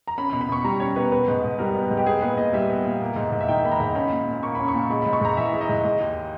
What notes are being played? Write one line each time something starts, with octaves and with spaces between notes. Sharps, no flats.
A#5
C#4 B5
B5
B2
B5
B2 C#6
G3 A#5
C#4 C#5
B2 B4
B3 B4
G#2
G#2
G3 A#4
B3
G#2
G4
B3 G#4
A#2 B4
A#2 D#5
G3 E5
B3
A#2
A#3
G#2
G#2
E5
D#3 G5
A#3 B5
A#5
G#2
C#4 B5
A#2
A#2
A#3 C#6
C#4 B5
C#6
A#2
G#3 B5
B5
G#2
C#6
G#2 A#5
E3 E5
G#3
D#5
G#2
G#3
D#2